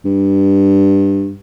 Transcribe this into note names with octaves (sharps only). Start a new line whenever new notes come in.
G2